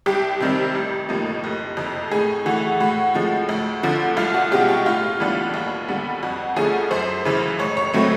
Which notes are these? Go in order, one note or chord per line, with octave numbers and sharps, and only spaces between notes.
C2 G4
C3 D#3 G3 C4
A1
A2 F3 A#3 D#4
F#1
F2 C3
A2 G#4
E3 A3 F#4
A2 F#4
F3 G#3
D2
D3 F3
C2 F4
F#4
B2 G#3 C#4 G4
G4
A2 F4
E3 G3 B3 D4
D#2
D3 G3 B3
F2 F#4
D3 F3 A3 C#4 G#4
F#2 C5
C#3 E3
A1 C#5
C#5
A2 F#3 A3 C4